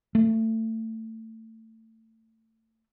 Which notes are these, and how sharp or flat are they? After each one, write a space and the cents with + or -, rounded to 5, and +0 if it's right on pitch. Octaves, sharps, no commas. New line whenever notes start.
A3 +25